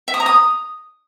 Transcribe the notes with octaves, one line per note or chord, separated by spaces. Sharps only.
E5
D#6
A#5
D#6